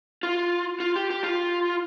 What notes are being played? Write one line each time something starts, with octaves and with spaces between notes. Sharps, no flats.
F4
F4
G4
G4
F4